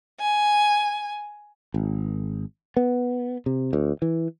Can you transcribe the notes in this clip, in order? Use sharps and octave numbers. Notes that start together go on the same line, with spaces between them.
G#5
G#1
B3
C3
D2
E3